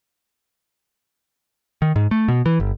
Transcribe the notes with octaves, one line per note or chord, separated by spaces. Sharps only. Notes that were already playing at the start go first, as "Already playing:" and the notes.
D#3
G#2
A3
B2
E3
G1